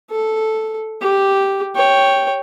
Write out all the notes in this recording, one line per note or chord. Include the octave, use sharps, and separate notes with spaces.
A4
G4
C#5 G5